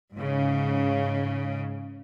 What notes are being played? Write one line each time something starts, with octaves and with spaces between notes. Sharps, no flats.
G#2 C#3